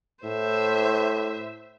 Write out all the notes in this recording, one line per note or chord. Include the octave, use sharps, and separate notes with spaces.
A2 C5 E5